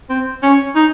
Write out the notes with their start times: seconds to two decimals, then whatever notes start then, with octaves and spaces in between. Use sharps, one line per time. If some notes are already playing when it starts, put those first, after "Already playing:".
0.09 C4
0.43 C#4
0.75 D#4